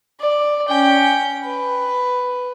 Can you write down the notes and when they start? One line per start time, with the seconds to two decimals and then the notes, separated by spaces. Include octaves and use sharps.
0.21 D5
0.69 C#4 G5
1.45 B4